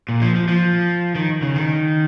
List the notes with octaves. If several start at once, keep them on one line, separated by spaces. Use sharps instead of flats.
A#2
F3
F3
F3
D#3
C#3
D#3